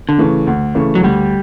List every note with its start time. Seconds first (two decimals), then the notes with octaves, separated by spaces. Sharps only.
0.09 D3
0.18 C#3 E3 A3
0.47 D2
0.75 C#3 E3 A3
0.95 F#3
1.03 D2 G3